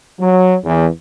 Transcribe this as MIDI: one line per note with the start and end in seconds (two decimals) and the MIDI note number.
0.20 0.56 54
0.65 0.86 40